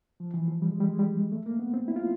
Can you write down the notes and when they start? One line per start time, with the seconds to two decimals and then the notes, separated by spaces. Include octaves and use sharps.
0.20 F3
0.34 E3
0.48 F3
0.62 G3
0.71 G#3
0.80 G3
0.89 G#3
0.99 G3
1.32 A3
1.46 A#3
1.59 B3
1.74 C4
1.88 E4
1.96 F4